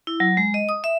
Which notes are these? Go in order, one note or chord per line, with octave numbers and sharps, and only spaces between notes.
E4
F#3
G#3
D#5
D#6
E5